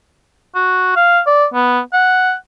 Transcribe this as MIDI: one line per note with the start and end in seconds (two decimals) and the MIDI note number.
0.55 0.93 66
0.96 1.20 77
1.27 1.46 74
1.54 1.80 59
1.93 2.34 78